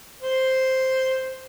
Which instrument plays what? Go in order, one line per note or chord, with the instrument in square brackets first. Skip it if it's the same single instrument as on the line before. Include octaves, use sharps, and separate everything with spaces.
[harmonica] C5